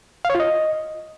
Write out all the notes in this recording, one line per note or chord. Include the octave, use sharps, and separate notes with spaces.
F5
C#5
F4
D#5